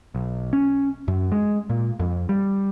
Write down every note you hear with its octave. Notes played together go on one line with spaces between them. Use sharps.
B1
C#4
F#2
G#3
A#2
F2
G3